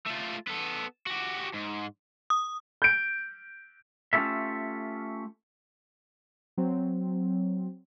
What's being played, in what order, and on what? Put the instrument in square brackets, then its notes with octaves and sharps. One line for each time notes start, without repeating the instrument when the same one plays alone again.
[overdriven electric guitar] A3 F4
B3 A4
F#4 G4
G#2
[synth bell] D#6
[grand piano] G6 D7
[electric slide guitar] A3 C#4 F4 G4 A4 E5
[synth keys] F#3 C4